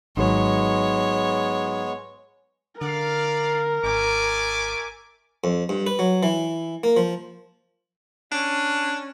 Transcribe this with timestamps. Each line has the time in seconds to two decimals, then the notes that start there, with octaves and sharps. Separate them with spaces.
0.17 G#1 G#2 F#3 G#3 B3 C#5
2.81 D3 A#4 D5 F5
3.84 G#1 A3 G#5 D6
5.44 F2
5.69 G2
5.87 B4
5.99 F#3
6.23 E3
6.84 A#3
6.97 F3
8.32 C#4 D4